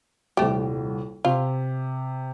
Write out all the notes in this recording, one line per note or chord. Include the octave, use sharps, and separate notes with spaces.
D#1 C2 A3 G4
C3 F4